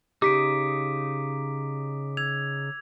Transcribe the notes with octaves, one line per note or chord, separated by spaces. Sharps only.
C#3 D#4 G4 D6 B6 D7
E6 G#6 F7